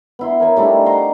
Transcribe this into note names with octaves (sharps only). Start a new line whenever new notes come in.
B3 E4 C6
A#4 C#5 G#5
G3 A3 D4 D#4
C5 F#5 A#5 C6